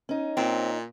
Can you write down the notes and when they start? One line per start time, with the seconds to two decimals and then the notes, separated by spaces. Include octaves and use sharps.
0.09 C#4 D#4
0.37 A#2 C4